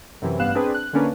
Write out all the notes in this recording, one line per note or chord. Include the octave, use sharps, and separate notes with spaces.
F#2 C3 E3
A1 G2 B3 F5 F#6 E7
C4 D4 G#4 B4
F#6
D3 A#3 C#4 D4 B4